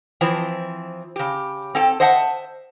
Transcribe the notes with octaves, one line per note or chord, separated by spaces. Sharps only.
E3 F3 C4
C#3 G4
C4 A4 G5
C5 D#5 E5 F#5 A5